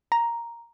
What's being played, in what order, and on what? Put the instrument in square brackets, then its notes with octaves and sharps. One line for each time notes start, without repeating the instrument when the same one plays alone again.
[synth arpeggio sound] A#5